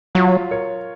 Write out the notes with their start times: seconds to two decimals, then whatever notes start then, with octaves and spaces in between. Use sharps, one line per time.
0.15 F#3 F4
0.51 A#4 C#5